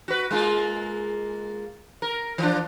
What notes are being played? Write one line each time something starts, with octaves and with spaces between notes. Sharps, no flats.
F#4 B4
G#3 A#3 F4
A#4
E3 F3 D4